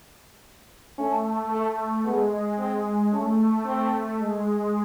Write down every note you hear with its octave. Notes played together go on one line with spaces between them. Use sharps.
A3 C#4
A3
G#3 B3
C4
A3 C#4
A3 C4
G#3